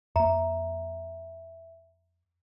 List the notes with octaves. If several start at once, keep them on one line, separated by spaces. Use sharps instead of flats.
F2 A#3 E5 A#5